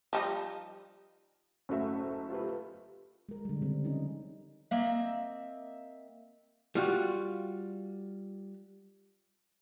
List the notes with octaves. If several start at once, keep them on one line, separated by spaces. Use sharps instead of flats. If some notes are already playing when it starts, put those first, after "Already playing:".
F3 G3 D#4
F#1 A3 C#4 F#4 E5
F4 G4 B4
G#3 A#4
D3 G3
C#3 G3 C4
F3 C#4 D#4
A#3 C4 D#5 E5
G3 F4 F#4